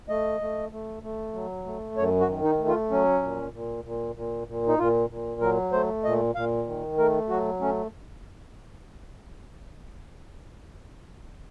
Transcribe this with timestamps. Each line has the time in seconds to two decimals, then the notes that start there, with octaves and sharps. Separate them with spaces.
0.09 A3 D#5
0.41 A3
0.72 A3
1.03 A3
1.34 F#3
1.66 A3
1.97 F#2 C#5
2.21 F#4
2.29 D#3
2.44 D#4
2.59 A3
2.68 F4
2.91 F#3 C#4
3.23 A#2
3.53 A#2
3.84 A#2
4.16 A#2
4.48 A#2
4.68 D#4
4.79 A#2 F4
5.10 A#2
5.41 F#3 A#4
5.72 A3 C5
6.04 A#2 D#5
6.35 A#2 F5
6.67 D#3
6.98 A3 A#4
7.29 F#3 F#4
7.61 A3 C#4